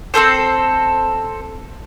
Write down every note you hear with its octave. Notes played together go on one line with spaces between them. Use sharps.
C4 G#4 A4 C5